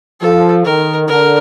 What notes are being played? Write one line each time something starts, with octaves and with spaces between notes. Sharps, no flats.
F3 A4
D#3 A#4
D3 A#4